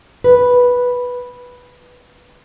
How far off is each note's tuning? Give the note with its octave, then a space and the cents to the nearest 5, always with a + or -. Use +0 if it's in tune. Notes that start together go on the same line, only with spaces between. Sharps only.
B4 -5